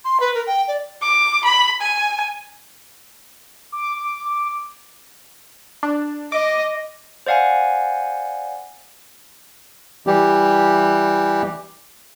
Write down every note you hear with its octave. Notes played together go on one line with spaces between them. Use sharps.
C6
B4
A#4
G5
D5
D6
B5
G#5
D6
D4
D#5 D6
C5 D5 F5 F#5 G#5
E3 G3 G4